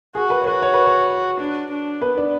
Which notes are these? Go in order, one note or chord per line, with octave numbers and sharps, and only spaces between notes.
F#4 G#4
B4
C#5
F#4 B4
C#5
B4
C#5
D4
D4
B3 B4
D4